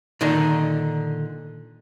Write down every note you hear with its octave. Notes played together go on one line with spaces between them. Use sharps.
A#2 D3 D#3 D4 D#4